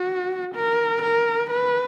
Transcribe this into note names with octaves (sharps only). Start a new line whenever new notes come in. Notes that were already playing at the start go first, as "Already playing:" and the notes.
Already playing: F#4
A#4
A#4
B4